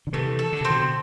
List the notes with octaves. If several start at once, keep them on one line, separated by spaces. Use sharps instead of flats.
D3
C3 E3 A3
A4
D3
C3 C4
B2 D3